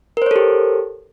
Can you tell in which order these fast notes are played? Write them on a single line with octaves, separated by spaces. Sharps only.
A#4 C5 C#5 A4 G4